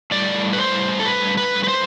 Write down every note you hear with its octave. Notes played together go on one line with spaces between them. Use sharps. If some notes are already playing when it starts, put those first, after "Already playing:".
A2 G3 D5
B4
C5
A4
B4
B4
B4
C5